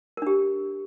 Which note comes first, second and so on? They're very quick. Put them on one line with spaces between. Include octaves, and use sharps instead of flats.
A#4 D4 G4